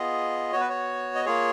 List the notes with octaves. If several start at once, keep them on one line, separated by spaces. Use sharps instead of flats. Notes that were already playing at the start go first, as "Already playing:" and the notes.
Already playing: B3 F4 G#4 D#5
B3 F#4 C#5
B4
C#5
D#5
A#3 F4 G#4 C#5